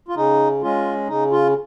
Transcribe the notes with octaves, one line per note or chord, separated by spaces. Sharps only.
F4
C#3 D#4
G#3 C#4 F4
C#3 D#4
F4